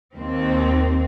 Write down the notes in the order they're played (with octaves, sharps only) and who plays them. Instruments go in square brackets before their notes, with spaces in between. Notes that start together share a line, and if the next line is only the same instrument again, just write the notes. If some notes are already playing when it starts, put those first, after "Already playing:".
[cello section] D#2 C4